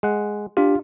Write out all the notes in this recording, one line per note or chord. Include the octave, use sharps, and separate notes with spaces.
G#3 F#5
D4 F4 G4